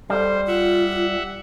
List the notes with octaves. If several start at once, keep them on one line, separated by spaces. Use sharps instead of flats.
G3 A4 C5
F4 E5 F#5